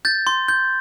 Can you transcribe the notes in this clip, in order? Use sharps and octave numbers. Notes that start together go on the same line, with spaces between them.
G6 A6
C6
G6